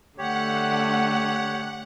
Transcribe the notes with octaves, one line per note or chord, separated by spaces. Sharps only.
D3 A3 G4 C#5 F#5